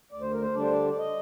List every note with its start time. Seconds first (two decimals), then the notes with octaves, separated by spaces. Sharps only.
0.12 D2 D5
0.22 C5
0.32 A#4
0.42 C5
0.54 D3 G3 D4 D5
0.63 C5
0.71 D5
0.90 D5
0.98 D#5